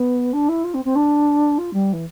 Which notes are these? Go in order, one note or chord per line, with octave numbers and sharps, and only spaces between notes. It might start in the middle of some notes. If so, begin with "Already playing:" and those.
Already playing: B3
D4
E4
F4
C4
C4
D4
F4
G3
E3